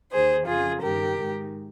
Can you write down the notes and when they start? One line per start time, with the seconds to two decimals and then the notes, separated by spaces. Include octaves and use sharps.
0.11 D#2 D#3 G#4 C5
0.46 F2 C#3 F3 F4 G#4
0.81 G2 D#3 G4 A#4
1.16 G#2 D#3